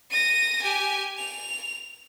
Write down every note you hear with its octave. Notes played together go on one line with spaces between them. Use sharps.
A#6 D#7
G4 G#5
F7